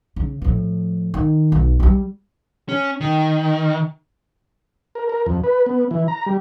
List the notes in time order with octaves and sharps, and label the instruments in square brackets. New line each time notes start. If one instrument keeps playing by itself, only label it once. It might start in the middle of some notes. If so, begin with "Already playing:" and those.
[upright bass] C#3
A2 F3
D#3
B1
F3 G3
[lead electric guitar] C#4
D#3
[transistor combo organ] A#4
A#4
F2
B4
B3
E3
A#5
G3